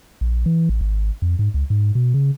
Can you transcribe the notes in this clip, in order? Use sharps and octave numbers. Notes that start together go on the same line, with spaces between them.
A#1
E3
A1
G#1
F2
G#2
C#2
G#2
B2
C#3